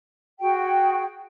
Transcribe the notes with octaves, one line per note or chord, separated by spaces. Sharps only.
F#4 G#4 G5